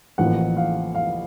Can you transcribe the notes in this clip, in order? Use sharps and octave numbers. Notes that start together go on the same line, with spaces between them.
A1 A2 F3 A#3 F#5
F5
F5